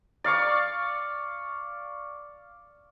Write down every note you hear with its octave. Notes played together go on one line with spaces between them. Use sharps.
D5 F5 C#6 D6